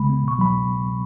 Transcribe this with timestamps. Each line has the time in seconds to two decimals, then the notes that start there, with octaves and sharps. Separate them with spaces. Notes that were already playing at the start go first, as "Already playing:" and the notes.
Already playing: C#3 G#3 B5
0.09 B3
0.24 B2 C#6
0.39 F#3 B5